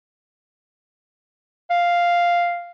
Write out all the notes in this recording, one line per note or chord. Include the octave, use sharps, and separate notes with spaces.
F5